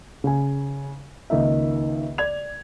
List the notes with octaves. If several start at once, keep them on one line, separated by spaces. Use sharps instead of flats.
C#3 G#5
C#2 D#3 A#3 D#4 E5
D5 G#6 F7